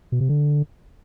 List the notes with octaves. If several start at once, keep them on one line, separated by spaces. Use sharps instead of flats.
B2
C3
D3